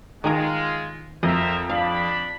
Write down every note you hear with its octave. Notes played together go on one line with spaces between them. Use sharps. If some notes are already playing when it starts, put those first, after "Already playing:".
D#3 G#3 F4 G#4 A#4
F2 A#4 C5 D#5 E5
D4 F5 B5